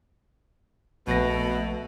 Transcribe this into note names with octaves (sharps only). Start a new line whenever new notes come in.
A#1 B2 A3 A#6